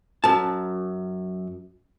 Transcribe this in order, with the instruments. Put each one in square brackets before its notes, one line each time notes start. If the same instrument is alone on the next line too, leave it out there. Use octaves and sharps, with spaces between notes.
[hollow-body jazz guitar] F#2 A5